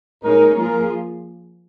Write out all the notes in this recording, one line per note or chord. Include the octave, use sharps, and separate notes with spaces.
A#2 G#3 D#4 G#4 A#4 C#5
F3 A#3 F4 G#4 A#4